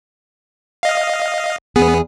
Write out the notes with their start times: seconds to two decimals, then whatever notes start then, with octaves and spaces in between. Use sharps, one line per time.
0.83 D#5 F5
1.76 E2 G#2 B3 G#4